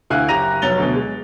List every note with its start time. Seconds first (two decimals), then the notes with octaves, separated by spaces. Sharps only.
0.10 D2 E4 F5 F#5 G#5 F#6
0.28 F#1 G4 A#5 A#6 D#7 F7
0.62 F1 F#3 A6 F7 G7
0.78 D2 B2
0.95 G#3